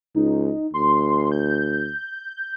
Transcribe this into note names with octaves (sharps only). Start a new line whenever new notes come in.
C#2 D#4
D2 C6
G6